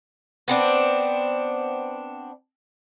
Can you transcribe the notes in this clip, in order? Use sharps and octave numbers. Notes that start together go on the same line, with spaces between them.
B3 C4 D4